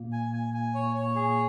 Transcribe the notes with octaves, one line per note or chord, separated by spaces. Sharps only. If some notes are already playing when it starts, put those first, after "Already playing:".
Already playing: A#2 A#3
G#5
G#5
G#5
C#5
C#5
G#4